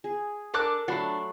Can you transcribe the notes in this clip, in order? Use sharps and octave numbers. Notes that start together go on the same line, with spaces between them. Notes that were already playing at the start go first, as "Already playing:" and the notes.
G#4
D4 A4 A#4 D6 F#6
F#3 A3 D4 F#5 B5 C7